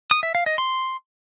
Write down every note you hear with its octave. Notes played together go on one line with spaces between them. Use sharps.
D#6
E5
F5
D#5
C6